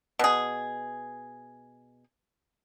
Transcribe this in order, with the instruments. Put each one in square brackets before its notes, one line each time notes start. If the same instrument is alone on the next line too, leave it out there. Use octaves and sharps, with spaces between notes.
[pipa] B2 G#4